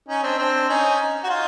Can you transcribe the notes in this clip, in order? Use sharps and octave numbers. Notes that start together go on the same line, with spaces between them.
C#4 D#4
C4 D4
C4 D4
C#4 D#4
F#4
D#4 F4